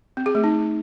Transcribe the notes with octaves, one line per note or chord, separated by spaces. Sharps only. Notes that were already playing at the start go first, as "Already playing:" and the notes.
C4
G#4
A3
D#4